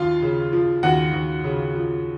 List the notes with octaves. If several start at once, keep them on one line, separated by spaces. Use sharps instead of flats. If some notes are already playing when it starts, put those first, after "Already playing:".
Already playing: D#2 F3 F4 F5
C#3
F3
D#2 F#4 F#5
D#2
C#3
F3